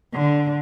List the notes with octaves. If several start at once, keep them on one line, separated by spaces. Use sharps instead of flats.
D3